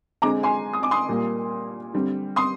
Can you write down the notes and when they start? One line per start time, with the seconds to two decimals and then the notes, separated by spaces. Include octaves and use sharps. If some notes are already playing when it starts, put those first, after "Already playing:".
0.22 D3 G#3 C4 A#5 D6
0.43 G#5 C6
0.73 D#6
0.83 D6
0.91 C6 D#6
1.08 A#2 G3 A#3
1.93 D3 G3 C4
2.36 C6 D#6